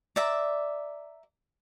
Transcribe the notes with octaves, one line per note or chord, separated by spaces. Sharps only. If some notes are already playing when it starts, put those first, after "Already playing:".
D5 E5 A#5